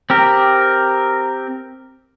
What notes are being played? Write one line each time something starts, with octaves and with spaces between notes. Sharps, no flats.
C4 G4 A#4